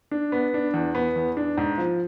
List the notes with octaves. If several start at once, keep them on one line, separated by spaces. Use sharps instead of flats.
D4
B3
D4
E2
B3
E2
D4
G#2
F3